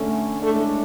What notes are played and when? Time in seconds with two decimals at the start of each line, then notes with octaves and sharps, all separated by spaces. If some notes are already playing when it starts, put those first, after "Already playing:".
Already playing: D3 A3 C#4
0.41 A2 G#3 A3 D4 A4